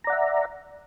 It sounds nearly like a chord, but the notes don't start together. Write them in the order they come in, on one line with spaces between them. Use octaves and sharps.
A#5 D5 F#5 E5